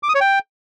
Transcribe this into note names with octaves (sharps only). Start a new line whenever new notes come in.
D6
D#6
C#5
G5